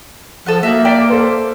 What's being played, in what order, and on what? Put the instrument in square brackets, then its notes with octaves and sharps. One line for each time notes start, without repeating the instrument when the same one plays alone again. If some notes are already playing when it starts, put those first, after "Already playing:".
[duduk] F3 [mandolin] A4 D#5 F#5
[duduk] A#3 [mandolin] D#4 F#4 E5
[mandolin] D5 [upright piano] G5 A6 B6
[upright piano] A4 C5